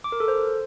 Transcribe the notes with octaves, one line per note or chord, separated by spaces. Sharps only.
D6
A#4
A4
C5